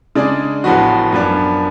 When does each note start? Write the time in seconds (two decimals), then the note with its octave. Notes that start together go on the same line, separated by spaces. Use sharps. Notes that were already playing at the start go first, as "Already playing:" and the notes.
0.15 C#3 G#3 D4 G#4 D5
0.64 A1 A2 F3 B3 F#4
1.12 F#2 F3 B3 D4